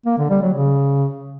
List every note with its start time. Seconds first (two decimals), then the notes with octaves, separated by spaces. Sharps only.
0.06 A#3
0.18 D3
0.30 G3
0.42 F#3
0.54 C#3